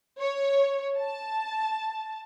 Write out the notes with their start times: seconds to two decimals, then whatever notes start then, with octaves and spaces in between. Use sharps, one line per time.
0.21 C#5
0.99 A5